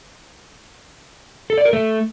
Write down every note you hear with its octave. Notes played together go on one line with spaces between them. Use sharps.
A4
D5
A#4
A3